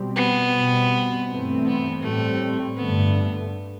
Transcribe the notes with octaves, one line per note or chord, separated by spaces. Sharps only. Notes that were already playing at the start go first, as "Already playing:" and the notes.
Already playing: B2 G3 C4
B3
B2 G3 C4
G2 E3 A3 C4
B3
A2 G3 A3 C4
G2 D3 A3 B3